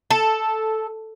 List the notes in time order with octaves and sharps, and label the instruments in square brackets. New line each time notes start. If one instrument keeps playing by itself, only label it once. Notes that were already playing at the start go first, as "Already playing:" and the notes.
[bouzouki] A4